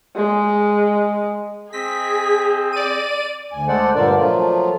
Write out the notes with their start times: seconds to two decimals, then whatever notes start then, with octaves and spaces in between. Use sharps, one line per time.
0.16 G#3
1.73 C4 G#4 D#5 B6
2.73 D5 D#7
3.52 D2 G#5
3.68 G#3 A3 A4 C5 D5 F#5
3.95 G2 A#2 D3 D4 A#4 D5
4.17 F3 F#3 A3 A#3 F4